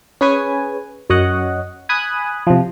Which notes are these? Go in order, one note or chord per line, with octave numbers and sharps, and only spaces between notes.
C#4 G#4 B4 C#5 G#5
F#2 C#5 D#5 F#5
G#5 B5 D#6 F#6
C3 F3